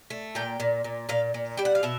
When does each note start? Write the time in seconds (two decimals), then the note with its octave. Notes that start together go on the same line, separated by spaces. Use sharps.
0.10 A3
0.35 A#2 G5
0.60 A#2
0.84 A#2
1.09 A#2 F5
1.34 A#2
1.57 G3 G5
1.65 F#5
1.75 F5
1.83 B2 E5